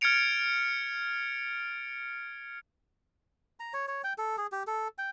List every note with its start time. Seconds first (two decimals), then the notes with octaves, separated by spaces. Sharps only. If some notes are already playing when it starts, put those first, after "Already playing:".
0.01 F6 G#6 A6 C#7 D7 F7
3.60 A#5
3.74 C#5
3.88 C#5
4.04 G5
4.18 A4
4.38 G#4
4.52 G4
4.67 A4
4.98 G5